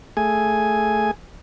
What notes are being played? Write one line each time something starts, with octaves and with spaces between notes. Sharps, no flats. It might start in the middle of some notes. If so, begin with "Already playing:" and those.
A3 G#4 G#5